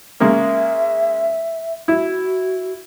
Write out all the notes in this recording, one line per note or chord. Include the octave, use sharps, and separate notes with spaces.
C#3 G#3 A#3 E5
E4 F#4